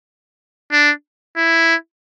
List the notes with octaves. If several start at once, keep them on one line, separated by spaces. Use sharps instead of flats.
D4
E4